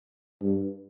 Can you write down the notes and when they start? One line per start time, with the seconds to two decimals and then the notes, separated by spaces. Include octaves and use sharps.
0.42 G2